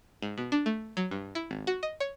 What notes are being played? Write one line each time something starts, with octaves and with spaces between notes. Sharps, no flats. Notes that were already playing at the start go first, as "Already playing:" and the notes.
G#2
B2
D4
A3
F#3
G2
E4
G#1
F#4
D#5
C#5